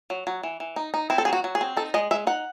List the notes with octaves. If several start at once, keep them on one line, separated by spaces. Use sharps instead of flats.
F#3
F#3
E3
E3
D#4
D#4
C4 E4
A4
F#3 G#4
F#4
F#3
G#4
C4
D#4 A4
G#3 D#5
G#3 E5
D#4 F#5